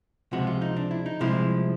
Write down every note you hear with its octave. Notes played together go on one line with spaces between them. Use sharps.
C#2 C3 F3 G#3 F#4
F4
D#4
D4
E4
D#4
C2 C3 F3 G#3 E4